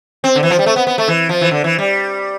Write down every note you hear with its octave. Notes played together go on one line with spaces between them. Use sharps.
C4
D3
E3
F3
G3
A3
B3
B3
A3
E3
F3
E3
D3
E3
G3